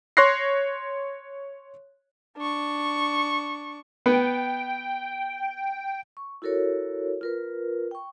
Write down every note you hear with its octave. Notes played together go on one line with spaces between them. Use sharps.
C#5 C6 C#6 F#6 A#6 C7
D4 C#6
B3 G5
C#6
E4 F#4 A4 A#4 C#5
F4 A#4 B4
G5 C#6